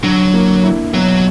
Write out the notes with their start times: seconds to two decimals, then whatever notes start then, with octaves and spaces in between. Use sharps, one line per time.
0.03 D3 F#3
0.34 A#3
0.63 E4
0.93 B2 F#3